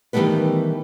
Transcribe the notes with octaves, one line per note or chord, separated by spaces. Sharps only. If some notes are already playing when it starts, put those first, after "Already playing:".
D#3 E3 G3 A3 B3 B4